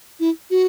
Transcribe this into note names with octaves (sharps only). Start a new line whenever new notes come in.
E4
F#4